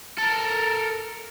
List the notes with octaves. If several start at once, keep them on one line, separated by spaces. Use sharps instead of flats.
A4 A#4